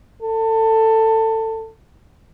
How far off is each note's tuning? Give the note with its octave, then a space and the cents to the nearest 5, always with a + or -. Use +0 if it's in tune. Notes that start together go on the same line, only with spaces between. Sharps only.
A4 +20